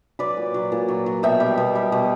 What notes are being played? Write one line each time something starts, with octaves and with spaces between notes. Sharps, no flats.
F#3 B4 D5
A#2
F#3
A#2
F#3
F#3
B2 E5 G5
G3
B2
G3
B2